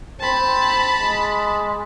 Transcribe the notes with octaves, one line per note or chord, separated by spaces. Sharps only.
C4 A5 B5
G#3